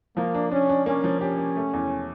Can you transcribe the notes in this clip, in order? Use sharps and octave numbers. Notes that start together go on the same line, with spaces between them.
F3 A#3
D4
C#4 D4
D4
A#3 C#4
F3
C#4 G4
A#3
A3
E2